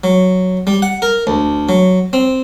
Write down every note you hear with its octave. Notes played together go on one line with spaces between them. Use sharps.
F#3
G3
F#5
A#4
D2
F#3
C4